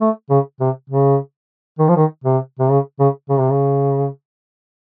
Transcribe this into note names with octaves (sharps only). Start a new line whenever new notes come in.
A3
C#3
C3
C#3
D#3
F3
D#3
C3
C3
C#3
C#3
C#3
C3
C#3